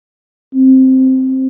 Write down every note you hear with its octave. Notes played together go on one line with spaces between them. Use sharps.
C4